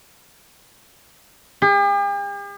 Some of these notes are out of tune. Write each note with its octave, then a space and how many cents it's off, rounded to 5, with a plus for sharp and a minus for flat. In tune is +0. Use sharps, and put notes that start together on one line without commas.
G4 +45